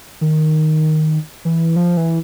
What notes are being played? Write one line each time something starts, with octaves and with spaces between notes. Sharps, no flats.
D#3
E3
F3
E3